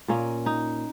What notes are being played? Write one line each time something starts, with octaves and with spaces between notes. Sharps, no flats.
A#2 A#3 C#4
D#4